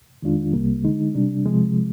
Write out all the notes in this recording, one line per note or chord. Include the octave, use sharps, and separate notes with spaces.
F2 D#3 G#3 D4 F4
C2 C3 G3 A#3
D3 G#3 D#4
C3 G3 D4
C3 F3 G#3